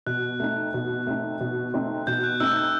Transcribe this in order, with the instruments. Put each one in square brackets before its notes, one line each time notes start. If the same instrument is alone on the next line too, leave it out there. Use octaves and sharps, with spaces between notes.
[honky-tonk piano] B2 [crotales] F#6
[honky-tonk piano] A3 C4 D#4
B2
A3 C4 D#4
B2
A3 C4 D#4
[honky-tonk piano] B2 [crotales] G6
[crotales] F#6
[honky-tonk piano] A3 C4 D#4 [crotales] E6
[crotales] G6